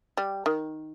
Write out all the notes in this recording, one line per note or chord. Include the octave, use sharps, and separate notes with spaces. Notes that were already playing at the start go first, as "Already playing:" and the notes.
G3
D#3